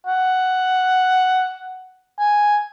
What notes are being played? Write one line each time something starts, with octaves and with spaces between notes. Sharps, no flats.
F#5
G#5